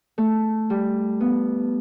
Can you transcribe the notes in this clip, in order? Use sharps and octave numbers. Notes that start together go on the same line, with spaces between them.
A3
G3
B3